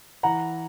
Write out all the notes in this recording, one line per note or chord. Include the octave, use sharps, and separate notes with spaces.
E3 F#5 A#5